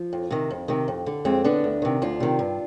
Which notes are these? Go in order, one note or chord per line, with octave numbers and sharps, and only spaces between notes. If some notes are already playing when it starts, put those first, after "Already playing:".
Already playing: F3
F2
C3 D#3
F2
C3 D#3
F2
D3
F2 G#3 C4
D3 B3 D4
D2
C3 D#3
D2 D4 F4
C3 D#3
G2